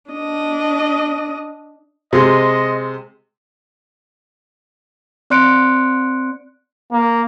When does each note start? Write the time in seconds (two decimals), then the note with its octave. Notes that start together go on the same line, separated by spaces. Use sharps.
0.11 D4 D#5
2.13 C3 G#3 D#5
5.30 C4 D5 C6 F#6 C#7 D7
6.92 A#3